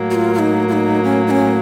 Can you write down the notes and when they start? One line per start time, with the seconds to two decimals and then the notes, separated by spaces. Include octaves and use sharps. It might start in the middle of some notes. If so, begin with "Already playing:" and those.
Already playing: A2 F#3 A#3
0.11 F#4
0.15 F4
0.34 F4
0.39 D#4
0.68 F4
0.73 D#4
1.04 C#4
1.27 D#4
1.31 C#4